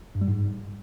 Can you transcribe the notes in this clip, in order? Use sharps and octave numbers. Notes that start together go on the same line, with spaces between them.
G2
G3
G#2